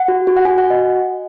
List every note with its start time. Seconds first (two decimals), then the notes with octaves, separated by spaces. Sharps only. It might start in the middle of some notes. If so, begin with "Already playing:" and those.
Already playing: F#5
0.08 F#4
0.27 F#4
0.37 F#5
0.45 F#4 G#5
0.58 F#5
0.64 F#4
0.70 D#5